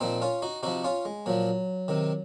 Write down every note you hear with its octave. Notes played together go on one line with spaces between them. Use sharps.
A#2 F3 C4 D#4
C#4 F4
D#4 F#4
C3 F3 D#4 F#4
C#4 F4
G#3
A#2 F3 F#3
C3 D#3